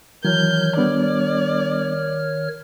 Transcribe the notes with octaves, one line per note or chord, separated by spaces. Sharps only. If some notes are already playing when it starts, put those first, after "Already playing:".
D#3 E3 F#3 C#5 F6 G6
G3 B3 D4 D5